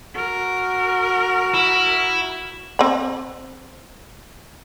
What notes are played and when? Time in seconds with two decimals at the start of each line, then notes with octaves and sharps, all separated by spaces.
0.15 F#4 A#4
1.55 E4
2.79 C4 B5